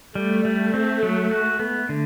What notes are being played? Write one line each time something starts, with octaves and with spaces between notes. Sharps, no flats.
G3 A3
G3
C4
F#3
F#4
B3
D3